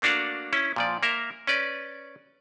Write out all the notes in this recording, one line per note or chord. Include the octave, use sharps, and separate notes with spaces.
A3 A#3 D4 F#4 F5 F#5
C#4 E4
A#2 F3 D5
A#3 A#4 E5
C#4 B4 D5